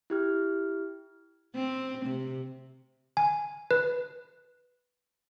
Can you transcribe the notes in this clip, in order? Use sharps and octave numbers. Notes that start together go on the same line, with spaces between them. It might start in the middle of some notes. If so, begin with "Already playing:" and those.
E4 G4 F6
C4
C3
G#5
B4